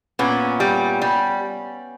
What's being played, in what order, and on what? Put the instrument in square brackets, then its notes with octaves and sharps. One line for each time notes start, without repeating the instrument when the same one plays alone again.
[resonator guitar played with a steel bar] A#2 B3 C#4
G3
G3